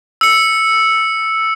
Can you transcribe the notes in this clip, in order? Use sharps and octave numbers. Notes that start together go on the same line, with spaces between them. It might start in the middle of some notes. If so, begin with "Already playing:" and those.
E6 C#7